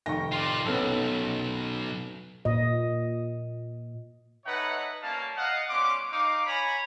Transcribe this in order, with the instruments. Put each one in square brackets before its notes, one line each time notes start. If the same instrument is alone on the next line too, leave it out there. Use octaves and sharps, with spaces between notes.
[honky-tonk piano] F1 D#3 G5 [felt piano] C#6 A#6
[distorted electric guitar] F4 D5 [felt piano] C6
[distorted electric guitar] B1 [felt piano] B3 C#4 A4
[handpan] A#2 D#5
[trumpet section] A3 D#4 B4 C#5 E5 F#5
G3 A#3 C#4 F5 A5
D#5 F5 F#5
G3 B3 C#4 C6 D6
D#4 F5 D6
C#5 G#5 A#5 B5